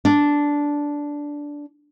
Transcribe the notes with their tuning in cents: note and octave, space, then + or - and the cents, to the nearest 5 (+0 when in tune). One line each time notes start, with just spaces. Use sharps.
D4 -10